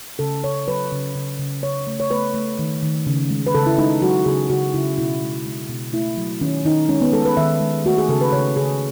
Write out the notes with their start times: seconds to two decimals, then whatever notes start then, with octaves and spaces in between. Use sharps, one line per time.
0.19 C#3 A4
0.44 C#3 C#5
0.67 F#3 B4
0.92 C#3
1.15 C#3
1.39 C#3
1.63 C#3 C#5
1.87 A3
2.00 C#5
2.11 A3 B4
2.34 A3
2.59 D#3
2.82 D#3
3.07 C#3
3.30 G#3
3.47 B4
3.55 C#3 A4
3.66 E4
3.78 G#3 D#4
4.02 F#3 F#4
4.26 C#3 G#4
4.50 C#3 F#4
4.74 C#3 E4
4.98 B2 E4
5.22 G#3
5.45 G#3
5.69 B2
5.93 A3 E4
6.17 F#3
6.41 D#3 C#4
6.65 D#3 D#4
6.89 G#3 C#4
7.01 B3
7.13 G#3 A4
7.25 B4
7.37 D#3 E5
7.61 G#3
7.85 A3 F#4
7.98 G#4
8.09 C#3 A4
8.21 B4
8.32 C#3 C#5
8.56 C#3 G#4